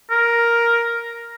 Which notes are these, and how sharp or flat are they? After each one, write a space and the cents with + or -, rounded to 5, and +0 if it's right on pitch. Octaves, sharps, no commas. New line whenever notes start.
A#4 +5